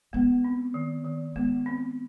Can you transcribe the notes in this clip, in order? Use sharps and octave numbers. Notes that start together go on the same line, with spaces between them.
G#3 B3
C4
D#3
D#3
G#3 B3
C4